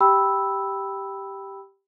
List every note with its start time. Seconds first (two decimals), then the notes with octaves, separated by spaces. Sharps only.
0.01 G4 G5 B5 E6